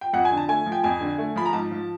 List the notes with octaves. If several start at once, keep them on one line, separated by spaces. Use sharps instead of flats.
G5
F2 F#5
G#5
D3
A5
A3 G#5
F3
G5
F2 G#5
D3
A3
F3 B5
A#5
G#2 A5
F3